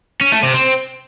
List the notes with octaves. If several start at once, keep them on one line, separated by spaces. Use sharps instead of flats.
C#4
A3
C3
C4